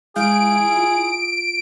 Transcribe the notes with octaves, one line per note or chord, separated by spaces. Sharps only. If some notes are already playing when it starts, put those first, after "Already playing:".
G#3 E4 G#4 F5 G6 D7
F4